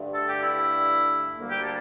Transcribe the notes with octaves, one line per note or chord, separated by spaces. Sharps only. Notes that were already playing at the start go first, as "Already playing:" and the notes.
Already playing: G2 D3 A3
A4
G4
E4
D2 D3 G3 A#3
G4
A4